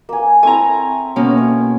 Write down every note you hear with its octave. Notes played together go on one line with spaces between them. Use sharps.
A#3 G#5
A3 C4 E4 G#5 A#5
B2 A#3 C#4
C#5